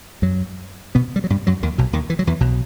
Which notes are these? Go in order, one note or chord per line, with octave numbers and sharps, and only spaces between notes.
F#2 F#3
B2 B3
G3
F#3
G2 G3
F#2 F#3
D#2 D#3
B1 B2
D#2 D#3
E3
F#3
E2 E3
B1 B2